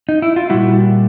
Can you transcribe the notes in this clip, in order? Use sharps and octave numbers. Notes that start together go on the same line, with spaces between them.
D#4
E4
F4
A#2 G3 E4 F#4